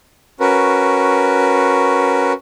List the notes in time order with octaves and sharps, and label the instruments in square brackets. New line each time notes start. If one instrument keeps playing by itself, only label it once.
[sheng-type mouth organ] C#4 F#4 A#4 B4